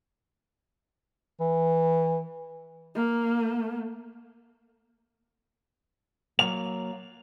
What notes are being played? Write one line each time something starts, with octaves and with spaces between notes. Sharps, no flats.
E3
A#3
F#3 A#3 F7